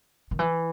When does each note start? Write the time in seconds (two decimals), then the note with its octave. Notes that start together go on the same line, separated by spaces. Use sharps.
0.31 D#3
0.39 E3